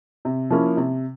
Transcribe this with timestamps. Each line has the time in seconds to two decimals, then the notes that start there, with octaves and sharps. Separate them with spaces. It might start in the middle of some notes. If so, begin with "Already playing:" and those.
0.25 C3
0.50 F3 A#3 C#4 E4
0.77 C3